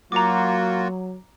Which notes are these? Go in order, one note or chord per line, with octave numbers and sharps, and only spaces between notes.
F#3 A#3 F4 F#4 A#5 D6